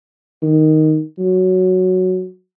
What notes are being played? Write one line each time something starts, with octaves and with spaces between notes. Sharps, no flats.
D#3
F#3